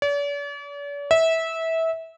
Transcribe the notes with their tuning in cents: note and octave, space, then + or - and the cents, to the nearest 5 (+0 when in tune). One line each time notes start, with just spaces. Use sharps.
D5 -45
E5 -20